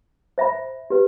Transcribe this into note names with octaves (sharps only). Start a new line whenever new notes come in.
C5 E5 B5
G4 B4